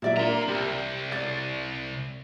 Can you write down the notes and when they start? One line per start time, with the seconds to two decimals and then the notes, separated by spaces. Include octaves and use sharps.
0.02 A#2 F#3 E4 D5 E5
0.17 A#3 D4 A#4 A#5 C6
0.48 C2 G4
1.12 D5 A6